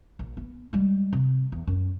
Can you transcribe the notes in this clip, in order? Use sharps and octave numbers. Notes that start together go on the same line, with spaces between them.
A#1
B3
G3 G#3
C3
E2
F#2